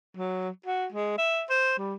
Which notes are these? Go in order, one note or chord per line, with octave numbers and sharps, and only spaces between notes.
F#3
F#4
G#3
E5
C5
G3